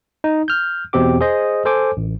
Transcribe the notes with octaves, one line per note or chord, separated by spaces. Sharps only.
D#4
F6 G6
E2 B2 C4 G4 D6
G#4 C5 D#5
A4 C5 G#5 D6
A1